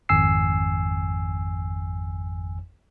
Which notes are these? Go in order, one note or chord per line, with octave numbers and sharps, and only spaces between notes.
G#1 F2 G#5 E6 C7